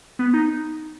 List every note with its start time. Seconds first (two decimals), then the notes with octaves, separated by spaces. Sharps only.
0.19 B3
0.34 D#4